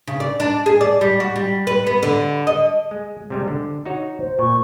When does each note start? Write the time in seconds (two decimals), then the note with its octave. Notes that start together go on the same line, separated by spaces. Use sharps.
0.07 C#3
0.20 D5
0.40 D4
0.66 G#4
0.81 D5
1.01 G3
1.20 F#4
1.36 G3
1.67 B4
1.87 B3
2.03 D3
2.47 D#5
2.91 G#3
3.30 C3 G3 G#3
3.48 D3
3.85 D#4 F#4 C#5
4.20 C5
4.39 A#2 C#6